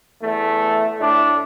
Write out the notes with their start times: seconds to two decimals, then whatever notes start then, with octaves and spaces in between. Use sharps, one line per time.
0.21 E2 A3
0.99 A2 A3 D4